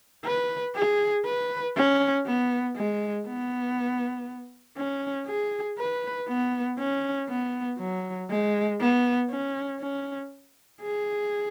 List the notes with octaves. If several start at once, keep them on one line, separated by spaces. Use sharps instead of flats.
B4
G#4
B4
C#4
B3
G#3
B3
C#4
G#4
B4
B3
C#4
B3
F#3
G#3
B3
C#4
C#4
G#4